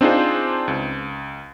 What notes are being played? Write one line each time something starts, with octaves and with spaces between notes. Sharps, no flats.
C4 D4 D#4 F4 G#4 C5
C#2